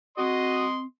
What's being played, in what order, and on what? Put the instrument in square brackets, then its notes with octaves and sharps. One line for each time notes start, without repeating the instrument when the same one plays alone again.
[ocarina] C4 [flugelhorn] F#4 [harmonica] D#5 C6 D#6